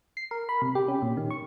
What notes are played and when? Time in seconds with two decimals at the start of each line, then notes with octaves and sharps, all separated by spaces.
0.17 C7
0.31 A#4
0.49 B5
0.62 C3
0.75 G4
0.88 C#4
1.02 A#2
1.17 D#3
1.31 C#6